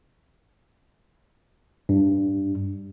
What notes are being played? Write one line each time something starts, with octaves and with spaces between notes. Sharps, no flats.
G2